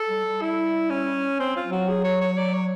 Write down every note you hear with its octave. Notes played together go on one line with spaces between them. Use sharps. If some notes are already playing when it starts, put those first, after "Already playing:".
Already playing: A4
G3
G3
E4
C#4
C4
F4
F#3
F#4
G#4
C#5
C#5
D5
C#5